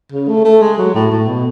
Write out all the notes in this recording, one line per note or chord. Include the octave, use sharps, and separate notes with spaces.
C#3
A3
A3
G#3
F#3
A2
A2
B2